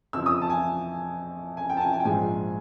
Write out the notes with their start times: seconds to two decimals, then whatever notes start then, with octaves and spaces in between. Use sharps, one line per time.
0.13 F2 C#3 F3 E6
0.26 D#6
0.42 A5
0.50 G#5
1.57 G#5
1.69 G5
1.77 A5
1.81 G#5
1.93 G#5
2.00 G5
2.05 A#1 G#2 F3 G#3 G#5